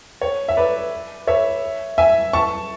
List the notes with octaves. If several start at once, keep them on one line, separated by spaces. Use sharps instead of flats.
C#5
E5
B4 D5
C#5 E5
E5 G#5
A5 C#6